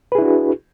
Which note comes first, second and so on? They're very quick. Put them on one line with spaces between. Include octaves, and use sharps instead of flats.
B4 G#4 E4 D4 F#4